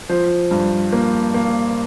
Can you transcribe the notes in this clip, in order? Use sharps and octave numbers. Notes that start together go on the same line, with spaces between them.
F3 C5
G2
A#3
A#3